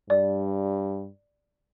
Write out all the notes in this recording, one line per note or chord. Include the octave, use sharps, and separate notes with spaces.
G2 D5